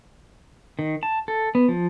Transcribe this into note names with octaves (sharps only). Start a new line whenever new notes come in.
D#3
A5
A4
B3
F3